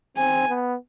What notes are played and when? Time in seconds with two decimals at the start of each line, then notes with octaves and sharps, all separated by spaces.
0.17 C4 G#5
0.49 B3